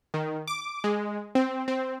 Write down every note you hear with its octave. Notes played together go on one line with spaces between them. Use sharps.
D#3
D6
G#3
C4
C4